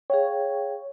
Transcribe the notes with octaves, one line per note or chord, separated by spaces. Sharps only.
G#4 C#5 F5 G5